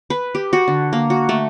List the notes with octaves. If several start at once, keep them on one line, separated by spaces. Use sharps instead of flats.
B4
G4
F#4
D3
A#3
F#4
A3